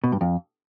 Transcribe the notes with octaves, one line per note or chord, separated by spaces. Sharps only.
B2
G2
F2